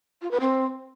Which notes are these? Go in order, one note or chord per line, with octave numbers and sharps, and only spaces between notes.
F4
B4
C4